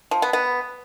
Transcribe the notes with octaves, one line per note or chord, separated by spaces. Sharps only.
F3
B3
B3